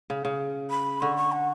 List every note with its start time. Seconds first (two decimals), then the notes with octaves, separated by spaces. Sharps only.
0.10 C#3
0.25 C#3
0.70 B5
1.01 D3 C#6
1.17 C#6
1.32 F#5